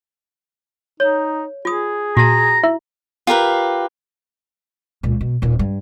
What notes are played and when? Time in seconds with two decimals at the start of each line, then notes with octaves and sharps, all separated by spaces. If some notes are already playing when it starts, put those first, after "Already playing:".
1.00 D#4 C#5
1.65 F4 G#4 D#6
2.17 A#2 F#4 A5 A#5
2.64 E4 E5
3.27 F4 G4 A#4 B4
5.03 C#2 A#2
5.21 B2
5.42 D#1 A#2
5.59 G2